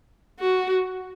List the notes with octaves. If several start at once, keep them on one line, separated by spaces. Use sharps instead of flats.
F#4